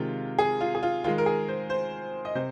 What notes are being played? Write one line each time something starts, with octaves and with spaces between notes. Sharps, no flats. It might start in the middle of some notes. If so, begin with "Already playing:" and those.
Already playing: C3 D#3 G#3 F4
G#4
F4
G#4
F4
D#3 G#3 F4
A#4
G#4
C5
C5
D#5
C3 C5